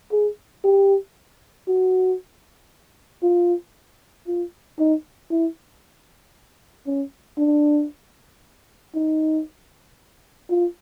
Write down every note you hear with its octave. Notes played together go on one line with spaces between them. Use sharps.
G#4
G4
F#4
F4
F4
D#4
E4
C#4
D4
D#4
F4